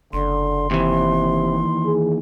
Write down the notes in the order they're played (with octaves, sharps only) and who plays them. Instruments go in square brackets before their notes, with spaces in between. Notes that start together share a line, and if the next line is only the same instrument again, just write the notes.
[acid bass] F#1 [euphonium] D3 [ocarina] C6
[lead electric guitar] D#2 E3 [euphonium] C3
[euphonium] G#4